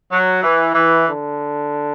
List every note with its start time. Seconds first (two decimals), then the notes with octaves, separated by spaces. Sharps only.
0.12 F#3
0.43 E3
0.74 E3
1.07 D3